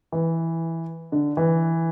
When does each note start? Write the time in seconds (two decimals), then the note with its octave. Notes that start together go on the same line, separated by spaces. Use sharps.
0.12 E3
1.12 D3
1.37 E3